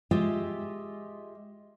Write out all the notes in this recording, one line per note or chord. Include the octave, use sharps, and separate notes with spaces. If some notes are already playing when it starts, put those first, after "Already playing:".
G#3 F4 G4 D#5 E5